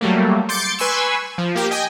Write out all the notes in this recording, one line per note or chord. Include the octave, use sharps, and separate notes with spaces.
F#3 G3 A3 A#3
C6 D6 G6 A6 C#7 D7
B4 G#5 C6 C#6 E6
F3
A#3 G4
D#5 G5 G#5